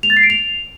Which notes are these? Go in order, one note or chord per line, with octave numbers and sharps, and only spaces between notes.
F7
A6
C7
D7
F7